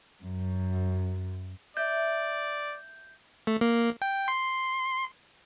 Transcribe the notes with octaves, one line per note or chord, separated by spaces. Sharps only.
F#2
D5 E5 G6
A3
A#3
G5
C6